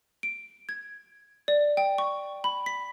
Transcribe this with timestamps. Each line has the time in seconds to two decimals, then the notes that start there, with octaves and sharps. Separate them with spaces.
0.23 D7
0.69 G#6
1.48 D5
1.77 G5
1.98 C#6
2.44 B5
2.66 B6